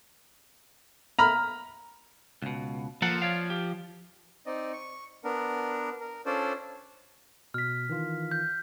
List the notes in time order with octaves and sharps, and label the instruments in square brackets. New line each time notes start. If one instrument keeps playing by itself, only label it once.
[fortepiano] A#5 B5 F6
[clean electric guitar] C#2 B2
[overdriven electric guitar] F3 [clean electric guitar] A#3 A4 F#5
[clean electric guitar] C#5 D5 F5
G4
[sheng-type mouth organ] C4 D#4 D5 D#5
C#6
B3 D4 A#4
A#4
C#4 D4 F4 A4 C5 D5
[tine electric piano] B2 [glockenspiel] F6 B6
[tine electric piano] D#3 E3 F4
[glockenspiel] G6